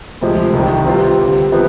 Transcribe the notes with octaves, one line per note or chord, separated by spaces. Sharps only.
D2 C3 F3 G#3
C2 C3 D#3
C3 G3 C4 F4 B4
D3 G3 C4
C3 F3 B3